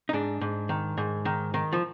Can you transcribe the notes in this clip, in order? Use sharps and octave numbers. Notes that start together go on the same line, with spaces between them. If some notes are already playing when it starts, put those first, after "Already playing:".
D#4
G#2 D4
G#2
D#3
G#2
D#3
D#3
F3